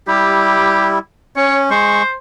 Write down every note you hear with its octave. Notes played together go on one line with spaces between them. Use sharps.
G3 E4 G4
C#4 C#5
G#3 C5 C#6